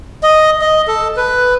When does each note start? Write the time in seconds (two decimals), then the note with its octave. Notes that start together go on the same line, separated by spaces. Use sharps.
0.23 D#5
0.61 D#5
0.88 A4
1.17 B4